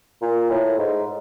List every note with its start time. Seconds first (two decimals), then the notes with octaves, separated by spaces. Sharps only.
0.22 A#2
0.50 A2
0.78 G#2